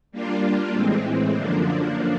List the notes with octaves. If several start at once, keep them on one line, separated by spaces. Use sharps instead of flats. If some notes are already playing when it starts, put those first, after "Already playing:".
G3 A#3 D4 F4
A2 E3 G#3 C4
F#2 D3 F3 A#3 D4